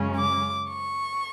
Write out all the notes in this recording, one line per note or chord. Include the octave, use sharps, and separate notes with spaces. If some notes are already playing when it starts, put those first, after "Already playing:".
Already playing: F#2 C#3 G#3 C#4
D6
C#6